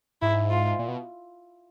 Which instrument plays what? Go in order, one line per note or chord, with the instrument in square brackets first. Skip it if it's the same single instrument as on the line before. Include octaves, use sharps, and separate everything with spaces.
[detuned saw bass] G#2 [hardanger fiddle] E4
[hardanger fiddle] F4
[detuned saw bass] A#2
B2